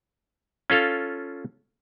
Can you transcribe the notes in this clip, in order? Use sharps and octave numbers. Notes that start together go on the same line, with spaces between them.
C#4 F4 A4 F5